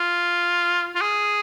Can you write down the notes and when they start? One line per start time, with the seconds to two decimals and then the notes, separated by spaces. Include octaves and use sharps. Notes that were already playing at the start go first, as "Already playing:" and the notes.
Already playing: F4
0.95 F4
1.01 G#4